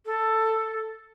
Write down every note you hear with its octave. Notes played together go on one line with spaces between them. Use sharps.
A4